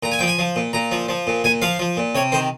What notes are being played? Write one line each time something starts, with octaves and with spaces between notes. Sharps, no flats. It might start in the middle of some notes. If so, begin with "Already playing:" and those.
A#2 A#5
G#5
F3 G5
G#5
F3
A#2
A#2 A#5
F3
F3
A#2
A#2 G#5
F3 F5
F3
A#2
C3 C#5
D#3 C5